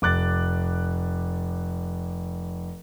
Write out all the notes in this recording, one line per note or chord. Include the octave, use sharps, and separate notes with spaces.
F1 D6 F#6 A6